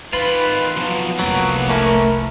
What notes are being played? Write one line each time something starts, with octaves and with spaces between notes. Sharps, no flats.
D#3 D#4 F4 B4 B5
F3 F#3 B3
F1 C2 F3 F#3 A#3
E3 A3 C#4 A#4